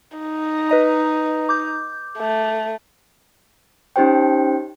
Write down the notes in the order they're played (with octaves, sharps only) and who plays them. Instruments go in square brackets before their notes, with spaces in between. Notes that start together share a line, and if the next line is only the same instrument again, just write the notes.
[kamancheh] D#4
[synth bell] B4 D#5 A#5
D6 G6
[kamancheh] A3
[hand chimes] C#4 D#4 G4 C5 G5